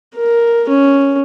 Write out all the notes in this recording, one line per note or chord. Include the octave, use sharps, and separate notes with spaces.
A#4
C#4